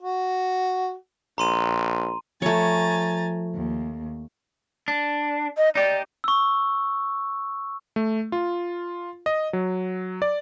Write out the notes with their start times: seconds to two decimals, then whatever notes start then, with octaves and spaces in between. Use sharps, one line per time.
0.02 F#4
1.38 A#1 A#5 C6 D#7
2.42 F3 A3 C#5 G#5 A#5 A6
3.54 D#2
4.88 D4
5.57 D#5
5.75 D#4 G4 D5
6.24 C#6 E6
7.96 A3
8.32 F4
9.26 D#5
9.53 F#3
10.22 D5